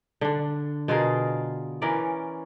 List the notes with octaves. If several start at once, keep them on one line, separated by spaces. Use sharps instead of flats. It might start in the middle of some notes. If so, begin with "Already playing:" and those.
D3 D4
B2 F4 G#4 A#4
E3 C#4 A#4 D5